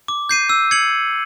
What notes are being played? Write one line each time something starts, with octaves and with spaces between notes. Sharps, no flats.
D6
G6 C7 D#7
E6
G#6 C#7 F#7